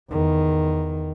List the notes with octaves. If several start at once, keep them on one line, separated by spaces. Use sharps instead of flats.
E2 D#3